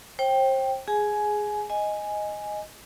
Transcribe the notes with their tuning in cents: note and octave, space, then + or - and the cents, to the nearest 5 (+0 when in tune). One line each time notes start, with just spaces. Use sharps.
C5 +35 G5 +0
G#4 +0 G#5 +20
D#5 +0 G#5 +0